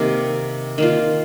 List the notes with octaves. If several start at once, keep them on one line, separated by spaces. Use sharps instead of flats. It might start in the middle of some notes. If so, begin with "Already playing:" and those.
Already playing: C3 D#3 A#3 G4
D#3 A#3 F4